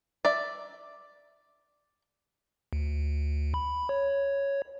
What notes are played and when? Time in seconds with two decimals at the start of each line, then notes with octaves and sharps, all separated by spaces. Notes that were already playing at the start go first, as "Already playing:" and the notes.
0.25 D5 E5
2.73 D2
3.54 B5
3.89 C#5